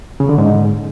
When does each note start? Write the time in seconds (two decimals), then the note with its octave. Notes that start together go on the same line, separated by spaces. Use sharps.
0.20 C#3
0.29 D3
0.38 G#2